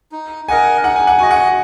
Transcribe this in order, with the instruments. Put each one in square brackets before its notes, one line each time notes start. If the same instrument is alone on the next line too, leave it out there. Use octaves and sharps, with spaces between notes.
[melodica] D#4
[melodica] A#4 D#5 F#5 [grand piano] G#5
[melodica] D#4 [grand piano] F#5
[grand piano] G#5
F#5
[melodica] F#4 D#5 [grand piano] G#5
[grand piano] F#5